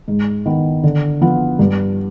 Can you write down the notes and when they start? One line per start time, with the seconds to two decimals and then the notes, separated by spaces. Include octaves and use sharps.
0.08 G#2
0.46 D#3 B3
0.83 D3
1.21 F3 B3 F4
1.59 G2